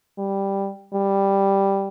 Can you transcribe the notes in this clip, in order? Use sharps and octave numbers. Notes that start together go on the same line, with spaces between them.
G3
G3